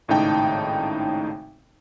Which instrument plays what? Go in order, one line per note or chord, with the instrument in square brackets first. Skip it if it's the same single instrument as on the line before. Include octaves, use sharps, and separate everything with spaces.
[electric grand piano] G#1 A2 C#3 D#4 G5 A5